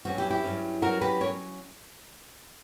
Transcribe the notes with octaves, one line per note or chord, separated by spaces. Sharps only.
G2 F#3 C#4 F#4
E4 G4
E4 G4
G2 F#3 C#4
G2 F#3 C#4 F#4 A#4
G4 B4
F#3 C#4 A#4 C#5